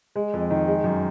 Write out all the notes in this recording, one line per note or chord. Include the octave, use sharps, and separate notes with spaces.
G#3
F2
D#3
G#3
F#2